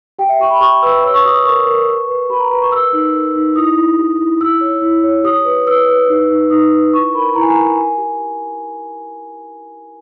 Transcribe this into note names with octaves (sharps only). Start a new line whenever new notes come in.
G4 G5
E5
G4 C#6
B5
G4 C#6
B4 E6
C#5 E6
C#6
G4 D#6
A#4 C#6
A#4
B4
B4
G4 B5
A#5
B4 A#5
C#6
A#4 E6
D#4
A#4
D#4
E4 D#6
E4
G4
E4
E4 E6
C#5
E4
C#5
G4 D#6
B4
B4 E6
B4
D#4
D#4
D#4 D#6
B4
E4 C#6
A#4 B5
E4 A#5
G#5
A#5
A#4
G4 G#5
G4